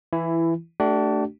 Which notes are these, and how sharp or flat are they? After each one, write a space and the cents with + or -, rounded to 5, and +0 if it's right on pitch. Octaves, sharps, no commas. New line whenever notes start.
E3 +5 E4 +15
A3 +0 D4 +0 G4 -45